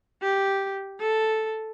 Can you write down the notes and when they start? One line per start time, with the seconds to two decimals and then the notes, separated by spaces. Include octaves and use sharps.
0.22 G4
1.00 A4